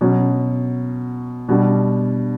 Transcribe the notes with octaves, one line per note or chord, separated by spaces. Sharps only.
B2 F#3 C#4
B2 G3 D4